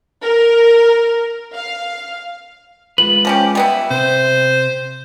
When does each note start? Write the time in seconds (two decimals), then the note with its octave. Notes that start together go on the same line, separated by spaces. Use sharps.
0.22 A#4
1.54 F5
2.98 G#3 F4 B4 F#7
3.25 F3 C#4 G4
3.55 G3 B3 E4
3.91 C3 C5